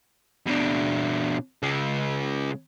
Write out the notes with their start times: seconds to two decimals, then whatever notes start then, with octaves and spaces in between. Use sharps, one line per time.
0.47 B2 D4
1.63 C#3 G#3